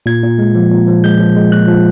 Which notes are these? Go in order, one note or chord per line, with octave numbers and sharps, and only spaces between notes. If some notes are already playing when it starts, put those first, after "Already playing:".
A#2 G#6
A#2
G#3
F3
A#2
F3
G#3 G6
F3
G#3
A#2 F#6
F3